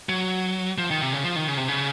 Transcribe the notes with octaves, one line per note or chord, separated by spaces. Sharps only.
F#3
F3
D#3
C3
C#3
F3
D#3
C#3
C3
C#3